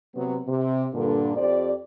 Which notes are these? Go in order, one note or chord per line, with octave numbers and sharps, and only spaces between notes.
C3 F#3 B3
C3
G2 A#2 D3
F2 G4 C5 D5